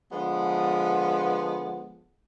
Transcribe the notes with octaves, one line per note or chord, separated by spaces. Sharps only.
D3 F3 G#3 B3